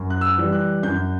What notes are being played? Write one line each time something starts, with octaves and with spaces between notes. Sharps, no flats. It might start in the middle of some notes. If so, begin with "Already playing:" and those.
Already playing: F#2
F#6
E6
E3 G3
F#6
F#2 G6